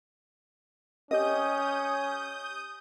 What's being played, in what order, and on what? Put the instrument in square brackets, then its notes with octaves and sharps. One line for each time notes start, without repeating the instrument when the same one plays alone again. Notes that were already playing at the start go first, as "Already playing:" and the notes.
[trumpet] C#4 [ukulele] G4 D#5 [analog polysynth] D#6 G6